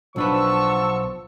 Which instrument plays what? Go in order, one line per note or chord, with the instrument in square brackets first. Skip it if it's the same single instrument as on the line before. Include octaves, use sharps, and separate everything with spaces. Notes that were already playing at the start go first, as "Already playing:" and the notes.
[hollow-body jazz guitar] B1 D4 B4 [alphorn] F3 [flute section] F#5 A5 E6 [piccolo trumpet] C#6